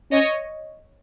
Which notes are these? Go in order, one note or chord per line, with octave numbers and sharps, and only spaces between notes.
C#4 C#5 D#5